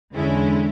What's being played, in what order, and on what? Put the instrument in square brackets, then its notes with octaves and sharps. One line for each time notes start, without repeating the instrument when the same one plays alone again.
[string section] E2 D3 G#3 C#4 E4